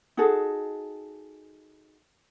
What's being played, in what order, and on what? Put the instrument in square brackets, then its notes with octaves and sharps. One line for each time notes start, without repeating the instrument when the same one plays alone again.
[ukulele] D#4 F#4 G#4 A4